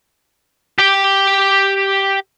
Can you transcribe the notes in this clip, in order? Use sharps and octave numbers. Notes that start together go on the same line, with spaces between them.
G4 G5